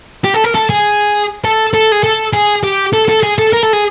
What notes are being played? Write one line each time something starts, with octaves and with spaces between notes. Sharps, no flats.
G4
A4
A#4
A4
G#4
A4
A4
G#4
A4
G#4
G4
A4
A4
G#4
A4
A#4
A4
G#4